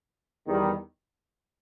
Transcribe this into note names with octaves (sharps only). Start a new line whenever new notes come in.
E2 D#3 G3